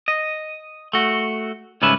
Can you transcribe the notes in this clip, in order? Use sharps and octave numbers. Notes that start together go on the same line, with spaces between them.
D#5
A3 F#4
C#2 G#2 G3 C#4 B4 E5